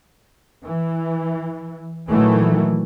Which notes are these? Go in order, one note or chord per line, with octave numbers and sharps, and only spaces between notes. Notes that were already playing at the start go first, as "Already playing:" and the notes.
E3
A#2 D#3 E3 F#3 A3